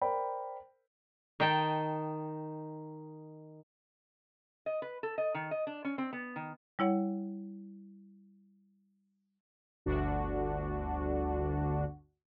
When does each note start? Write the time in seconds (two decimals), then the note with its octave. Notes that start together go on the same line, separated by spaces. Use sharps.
0.01 A#4 C5 D5 G5 B5
1.40 D#3 D#4 G5 A5
4.66 D#5
4.82 B4
5.03 A4
5.18 D#5
5.34 D#3
5.51 D#5
5.67 D4
5.84 C#4
5.98 C4
6.13 B3
6.36 D#3
6.79 G3 E4 C#5 F#5
9.86 G1 D2 D3 D4 F#4